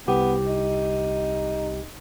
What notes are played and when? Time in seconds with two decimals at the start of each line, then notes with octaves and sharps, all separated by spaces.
0.07 C2 B3 G4
0.47 D#4